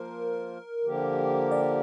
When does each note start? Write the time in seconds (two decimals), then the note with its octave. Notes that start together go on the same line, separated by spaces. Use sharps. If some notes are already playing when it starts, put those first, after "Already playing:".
Already playing: F3 A#3 F4 A#4 C5
0.85 D3 F3 A#3 G4 A#4
1.51 D5